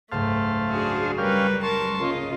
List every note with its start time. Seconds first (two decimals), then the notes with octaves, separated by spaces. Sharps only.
0.12 F#1 C#2 G#2 A3 C5 F5 A5
0.69 D4 F#4 G#4 E5
1.18 G3 C#4 G4 A#4 B4 F5
1.63 A#4 A5 C6 C#6
2.01 C#3 A#3 F4 D#5